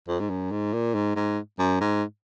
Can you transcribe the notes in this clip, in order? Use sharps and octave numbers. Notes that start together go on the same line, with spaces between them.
F2
G#2
F#2
G#2
A#2
G#2
G#2
F#2
G#2